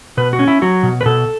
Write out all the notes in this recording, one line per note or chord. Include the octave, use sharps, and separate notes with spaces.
B2 B4
F#4
C#4
E4
F#3 F#4
B2
B4
B2 A4